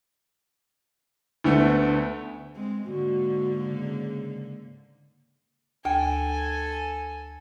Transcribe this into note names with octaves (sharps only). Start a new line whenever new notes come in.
D2 D3 A3 B3
G#3 C4
G#2 D3 A#3 F#4
C#3
D2 A4 G5 G#5